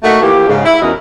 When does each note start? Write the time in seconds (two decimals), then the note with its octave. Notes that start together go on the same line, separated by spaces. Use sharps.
0.03 A3 A#3 D#4 F#4
0.22 E3 F3 A#3 G4
0.48 G#2 C#3
0.65 E4
0.82 E2 C#4 D#4 F#4 A#4 D#5